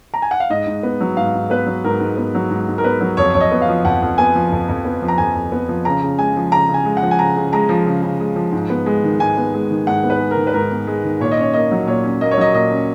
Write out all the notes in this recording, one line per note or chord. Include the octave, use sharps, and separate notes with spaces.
A#5
G#5
F#5
F5
G#2 D#5
G#2
B3
F#3
G#2 F5
G#2
B3 B4
F#3
G#2 A#4
G#2
B3
F#3
G#2
G#2
A#4
B3 B4
F#3
F2 C#5
F2 C#5
D#5
B3
F5
F3
F2 F#5
F2
B3 G#5
F3
F2
F2
B3
F3
A#5
F2 G#5
F2
B3
F3
C#3 A#5
C#3
G#3 G#5
F3
C#3 A#5
C#3
G#5
G#3
F#5
F3
G#5
C#3 A#5
C#3
G#3 A#5
F3
C#3
C#3
G#3
F3
G#2
B3
G#3
D#3
G#2 G#5
B3
G#3
D#3
G#2 F#5
B3
B4
G#3
A#4
D#3
B4
G#2 A#4
B3
G#3
D#3
A#2 C#5
D#5
C#4 C#5
A#3 D#5
F#3
A#2 C#5
C#4
A#3 D#5
C#5
F#3 D#5
A#2 D#5
C#4